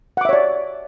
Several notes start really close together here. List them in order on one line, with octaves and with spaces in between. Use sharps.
F#5 D6 E5 C#5 D5